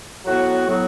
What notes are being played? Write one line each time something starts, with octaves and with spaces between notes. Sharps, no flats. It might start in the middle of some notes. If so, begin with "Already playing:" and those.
A2 F#3 B3 F#4
A2 F#3 B3 F#4